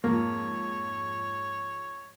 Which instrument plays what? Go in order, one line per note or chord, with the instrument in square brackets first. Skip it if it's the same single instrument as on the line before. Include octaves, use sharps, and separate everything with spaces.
[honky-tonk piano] F2 G#2 F3 [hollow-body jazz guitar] A#3 [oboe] C#5